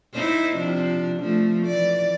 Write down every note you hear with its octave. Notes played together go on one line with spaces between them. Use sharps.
D#4 E4 C5
C3 F3 D4
F3 A3
E3 D5